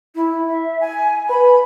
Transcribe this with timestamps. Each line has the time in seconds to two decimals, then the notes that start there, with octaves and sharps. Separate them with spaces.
0.15 E4
0.49 E5
0.81 G#5
1.29 B4 B5